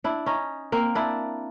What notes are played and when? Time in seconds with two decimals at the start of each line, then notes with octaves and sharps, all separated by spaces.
0.04 D4 E4
0.26 C#4 D#4
0.72 A#3 C4
0.95 D4 E4